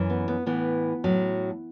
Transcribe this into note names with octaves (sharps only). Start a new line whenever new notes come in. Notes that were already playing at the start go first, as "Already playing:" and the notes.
Already playing: F#2 E3
B3
B3
A2 E3 B3
A2 F#3